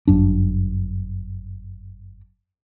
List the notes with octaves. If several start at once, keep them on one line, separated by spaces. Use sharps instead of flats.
G1 F#2 D4